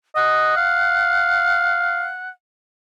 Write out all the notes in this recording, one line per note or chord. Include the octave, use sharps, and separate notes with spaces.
D#5 F#5
F5